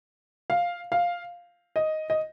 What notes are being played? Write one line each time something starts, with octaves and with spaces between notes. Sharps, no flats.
F5
F5
D#5
D#5